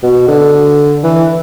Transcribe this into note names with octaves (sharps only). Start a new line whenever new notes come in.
B2
D3
E3